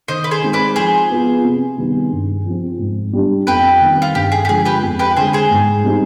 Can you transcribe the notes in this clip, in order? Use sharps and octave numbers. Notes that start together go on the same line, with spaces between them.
D#3 C5 D#5
B4
G#4 C5
G#3 C4 D#4
B4 D5
F3 G#4 C5
B3 F4
C3
D#3 G3 B3 D#4
G2
F3 C4
G#2
G3 D4
F2 G4 B4
D#3 G3 C4
F4
G2 G4
G#4
G4
D3 F3 G#3 G#4
G4 B4
F2
G4 B4
D3 G#3 G#4 C5
G#4 C5
G#2
G3 C4 D#4